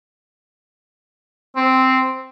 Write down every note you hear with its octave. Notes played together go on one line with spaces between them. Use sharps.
C4